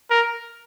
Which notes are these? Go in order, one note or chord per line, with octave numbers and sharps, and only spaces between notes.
A#4